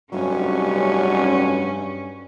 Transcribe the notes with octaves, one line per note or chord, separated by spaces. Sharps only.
F1 G2 F#3 C#4